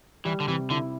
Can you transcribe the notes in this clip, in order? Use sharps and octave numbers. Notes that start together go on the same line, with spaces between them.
E3 G3
D3
C3 E3
D3 E4